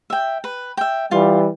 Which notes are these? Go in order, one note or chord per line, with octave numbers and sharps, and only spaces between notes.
E5 G5
B4
E5 G5
E3 G3 F4